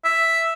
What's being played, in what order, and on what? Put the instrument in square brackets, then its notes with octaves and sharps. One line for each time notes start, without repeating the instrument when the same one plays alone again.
[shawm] E5